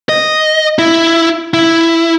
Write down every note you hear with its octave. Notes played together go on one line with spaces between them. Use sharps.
D#5
E4
E4